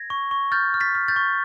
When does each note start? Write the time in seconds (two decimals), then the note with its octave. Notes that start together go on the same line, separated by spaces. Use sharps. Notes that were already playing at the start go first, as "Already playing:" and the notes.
Already playing: G#6 A#6
0.10 C#6
0.31 C#6
0.52 F6 G6 A6
0.74 F6
0.80 A6 B6
0.95 F6
1.08 G6 A6
1.16 C#6